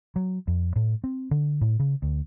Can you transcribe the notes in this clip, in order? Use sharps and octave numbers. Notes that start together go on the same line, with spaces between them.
F#3
F2
A2
C4
D3
A2
C#3
D2